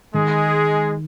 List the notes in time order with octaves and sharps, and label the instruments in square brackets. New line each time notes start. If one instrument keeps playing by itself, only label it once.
[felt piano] D#3 [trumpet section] G#3 G#4